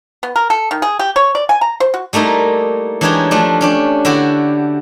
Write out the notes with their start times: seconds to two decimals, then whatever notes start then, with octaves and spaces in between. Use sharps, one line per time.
0.23 B3
0.36 A#4
0.50 A4
0.71 D#3
0.82 G#4
0.99 G4
1.16 C#5
1.35 D5
1.49 G#5
1.61 A#5
1.80 C5
1.94 F#4
2.13 G3 A3 A#3 D#4 E4
3.01 E3 G#3 D4 D#4 G4 C#5
3.31 F3 A3 D4
3.61 C#4 D4 G4
4.05 D3 E4 F#4 G4